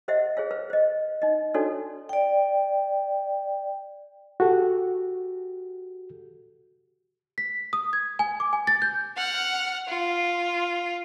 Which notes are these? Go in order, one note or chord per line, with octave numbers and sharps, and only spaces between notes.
G4 C5 D#5 E5 F#5
G#4 C5 C#5 F5
B4 C5 F5
C5 D#5
D#4 D#5
D4 D#4 F#4 A4 C#5 D5
D5 G5
F#4 G4 A4
B6
D#6
G#6
G#5
D6
G#5
A6
G6
F#5 F6
F4